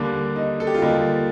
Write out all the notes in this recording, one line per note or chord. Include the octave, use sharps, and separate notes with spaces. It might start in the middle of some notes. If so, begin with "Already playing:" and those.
Already playing: D#2 D3 G3 A#3 D4
D#4
A4
G4
F4
D#2 D3 G3 A#3 D#4